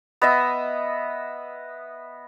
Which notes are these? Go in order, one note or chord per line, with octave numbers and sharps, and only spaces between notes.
B3 D#5 E5